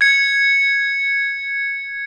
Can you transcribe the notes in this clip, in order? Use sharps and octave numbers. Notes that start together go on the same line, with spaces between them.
G#6 C#7